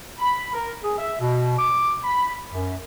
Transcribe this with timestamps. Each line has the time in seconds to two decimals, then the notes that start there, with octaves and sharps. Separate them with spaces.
0.19 B5
0.54 A#4
0.83 G#4
0.98 E5
1.21 B2
1.58 D6
2.04 B5
2.51 F#2